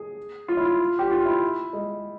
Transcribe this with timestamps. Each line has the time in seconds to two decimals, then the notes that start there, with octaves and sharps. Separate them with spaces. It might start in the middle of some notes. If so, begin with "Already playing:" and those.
Already playing: G#4
0.48 F4
0.57 E4
0.65 F4
0.99 G4
1.11 F4
1.26 E4
1.73 G#3